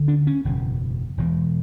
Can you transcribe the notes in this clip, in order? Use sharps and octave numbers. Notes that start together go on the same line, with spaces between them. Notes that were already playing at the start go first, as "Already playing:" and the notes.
Already playing: D2 D3
D4
C#4
F#1 E2 B2
E1 E2 B2